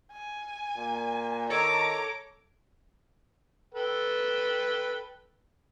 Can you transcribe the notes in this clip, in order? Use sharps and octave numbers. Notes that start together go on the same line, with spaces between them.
G#5
A#2
D#3 A4 C#5 A#5 D6
A4 B4 G5